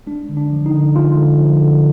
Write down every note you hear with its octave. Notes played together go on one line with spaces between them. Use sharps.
G#3 D4
D3
D4
F3
D#4
D3
G#3 F4
D3
F3
D3